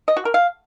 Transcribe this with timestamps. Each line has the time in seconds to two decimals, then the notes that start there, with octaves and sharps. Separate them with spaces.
0.08 D#5
0.17 F#4
0.25 A#4
0.34 F5